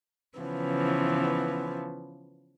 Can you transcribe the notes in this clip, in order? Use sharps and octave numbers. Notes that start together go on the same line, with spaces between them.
C#3 E3 F3 B3